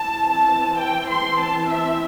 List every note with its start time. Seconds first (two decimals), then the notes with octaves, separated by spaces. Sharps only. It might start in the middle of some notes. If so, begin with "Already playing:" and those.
Already playing: E3 C4 A5
0.32 A5
0.79 G5
1.09 C6
1.40 A5
1.71 E5